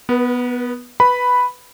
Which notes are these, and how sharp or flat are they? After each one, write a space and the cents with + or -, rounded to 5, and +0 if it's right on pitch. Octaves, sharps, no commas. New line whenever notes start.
B3 +0 B4 -40
B4 +0 B5 +0